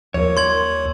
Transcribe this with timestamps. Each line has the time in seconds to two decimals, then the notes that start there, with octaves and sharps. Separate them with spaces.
0.14 D#2 F3 A#4 C#5
0.37 D5 C6 G#6 F#7